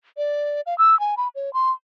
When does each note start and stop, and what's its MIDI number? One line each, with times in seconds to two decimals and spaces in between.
0.17 0.61 74
0.66 0.77 77
0.78 0.98 88
1.00 1.15 80
1.17 1.28 83
1.35 1.53 73
1.54 1.71 84